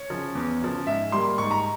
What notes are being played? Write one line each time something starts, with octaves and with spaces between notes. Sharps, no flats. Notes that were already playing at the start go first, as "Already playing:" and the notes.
Already playing: C#5
C#3 F3
E2
C#3 F3
G#2 E5
G3 A#3 C6
G#2 C#6
A#5